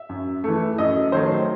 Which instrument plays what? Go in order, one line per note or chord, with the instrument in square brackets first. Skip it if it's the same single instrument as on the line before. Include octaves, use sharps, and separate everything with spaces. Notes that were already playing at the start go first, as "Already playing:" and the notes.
Already playing: [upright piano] E5
F#2
E3 A3
F#2 D#5
D#3 F#3 A3 C5